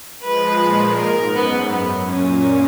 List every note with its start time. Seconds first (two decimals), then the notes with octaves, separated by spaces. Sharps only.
0.23 F3 G#3 B4
0.60 A#2
0.97 G#2 A#4
1.35 F#2 B3
1.72 F#2 B3
2.08 A#2 C#4